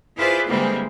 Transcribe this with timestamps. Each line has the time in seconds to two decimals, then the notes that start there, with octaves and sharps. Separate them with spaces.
0.16 E4 F4 G#4 B4 C5 D5
0.48 D3 E3 G3 G#3 A#3 C4